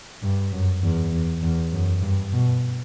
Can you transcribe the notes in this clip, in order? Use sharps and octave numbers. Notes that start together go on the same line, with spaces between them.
G2
F#2
E2
E2
E2
F#2
G2
B2